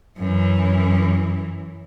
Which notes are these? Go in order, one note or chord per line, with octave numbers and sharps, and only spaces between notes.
F#2 E3